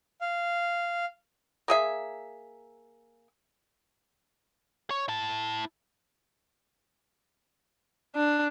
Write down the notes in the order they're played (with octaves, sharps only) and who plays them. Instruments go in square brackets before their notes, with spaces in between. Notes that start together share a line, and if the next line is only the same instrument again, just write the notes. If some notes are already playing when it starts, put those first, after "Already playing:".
[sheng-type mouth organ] F5
[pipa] A#3 G#4 E5
[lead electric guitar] C#5
E4 A5
[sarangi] D4